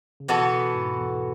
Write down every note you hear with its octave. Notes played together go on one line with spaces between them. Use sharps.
C#3
B2 E3 B3 F#4 A4
B2
G#2
E2